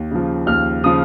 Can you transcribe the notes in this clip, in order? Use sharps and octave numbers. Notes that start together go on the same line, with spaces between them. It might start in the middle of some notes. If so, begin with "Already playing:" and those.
Already playing: D#2
C#3 F3
D#2 F6
C#3 F3 D#6